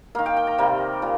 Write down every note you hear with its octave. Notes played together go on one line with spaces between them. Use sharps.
D#3 A#3 F5
G5
G5
A#5
C3 G3 A#3
A#2